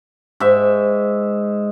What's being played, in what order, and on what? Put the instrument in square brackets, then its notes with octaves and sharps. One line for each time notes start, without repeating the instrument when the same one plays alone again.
[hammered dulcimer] G#2 E5